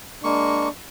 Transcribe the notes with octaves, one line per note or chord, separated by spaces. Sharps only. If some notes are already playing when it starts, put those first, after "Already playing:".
G#3 A#3 D4 C#6